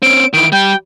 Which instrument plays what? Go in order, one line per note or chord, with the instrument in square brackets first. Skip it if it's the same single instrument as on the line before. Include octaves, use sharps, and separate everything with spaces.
[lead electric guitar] C4 C#4 [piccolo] D7
[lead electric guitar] D#3 E3 [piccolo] D7
[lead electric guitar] G3 [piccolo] G5